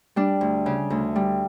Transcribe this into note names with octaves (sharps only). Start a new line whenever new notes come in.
G3 D4
D2
C#3
D2
G3